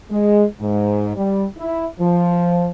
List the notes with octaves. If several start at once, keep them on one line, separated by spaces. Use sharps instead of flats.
G#3
G#2
G3
E4
F3